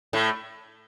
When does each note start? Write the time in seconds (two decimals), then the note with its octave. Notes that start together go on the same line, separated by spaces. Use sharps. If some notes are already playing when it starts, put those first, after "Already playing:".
0.13 A2 A3